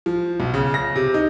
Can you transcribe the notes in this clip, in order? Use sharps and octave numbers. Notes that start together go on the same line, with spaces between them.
F3
B1
C#3
A#6
C3
D#4